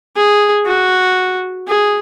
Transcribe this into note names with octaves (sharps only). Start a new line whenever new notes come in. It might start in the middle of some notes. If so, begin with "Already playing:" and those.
G#4
F#4
G#4